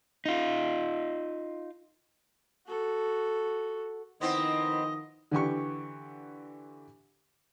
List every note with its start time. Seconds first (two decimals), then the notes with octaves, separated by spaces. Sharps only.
0.25 D#4 F4
2.67 F#4 A4
4.21 D#3 F3 B3 C4 D#4 E4 D#5
5.31 D3 E3 G4 C#6